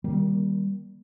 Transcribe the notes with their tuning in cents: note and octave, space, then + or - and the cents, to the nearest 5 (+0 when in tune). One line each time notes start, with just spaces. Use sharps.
D#3 +0 G3 +0 A#3 +25